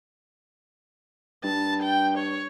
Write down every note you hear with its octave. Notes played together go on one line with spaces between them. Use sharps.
G2 A5
G5
C#5